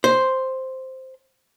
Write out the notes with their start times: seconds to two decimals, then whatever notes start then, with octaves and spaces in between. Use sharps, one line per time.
0.04 C5